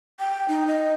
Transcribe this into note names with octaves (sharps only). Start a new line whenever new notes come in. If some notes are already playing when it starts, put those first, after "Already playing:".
G5
D#4
D#5